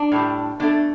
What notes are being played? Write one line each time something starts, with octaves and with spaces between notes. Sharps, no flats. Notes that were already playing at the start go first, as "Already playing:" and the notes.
Already playing: D4
A2 G3
B2 A3 D4